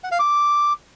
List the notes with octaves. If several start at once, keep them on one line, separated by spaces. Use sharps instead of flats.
F#5
F5
D6